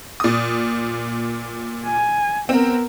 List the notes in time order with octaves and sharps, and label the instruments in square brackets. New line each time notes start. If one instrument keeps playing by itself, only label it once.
[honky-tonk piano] A#2 D#6
[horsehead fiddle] G#5
[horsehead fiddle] B3 A#4 [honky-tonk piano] C4